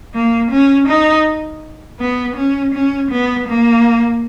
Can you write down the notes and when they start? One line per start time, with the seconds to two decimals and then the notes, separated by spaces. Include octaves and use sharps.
0.14 A#3
0.51 C#4
0.88 D#4
1.99 B3
2.36 C#4
2.74 C#4
3.10 B3
3.48 A#3